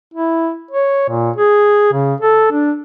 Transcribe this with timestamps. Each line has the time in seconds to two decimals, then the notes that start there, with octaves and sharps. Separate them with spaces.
0.14 E4
0.71 C#5
1.10 A#2
1.36 G#4
1.93 C#3
2.21 A4
2.52 D4